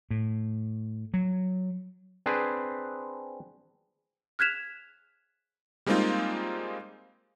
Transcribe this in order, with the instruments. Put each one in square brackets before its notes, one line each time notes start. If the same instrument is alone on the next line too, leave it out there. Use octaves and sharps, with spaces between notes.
[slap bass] A2
F#3
[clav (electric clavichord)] C4 D4 G#4 B4 C5
[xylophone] F6 F#6 G#6 B6 E7 F7
[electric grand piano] G3 G#3 A#3 C4 D#4 F4